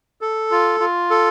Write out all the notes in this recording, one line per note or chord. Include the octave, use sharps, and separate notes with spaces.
A4
F4
F4
A4